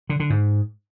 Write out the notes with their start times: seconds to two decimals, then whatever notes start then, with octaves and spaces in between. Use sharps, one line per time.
0.09 D3
0.20 D3
0.30 G#2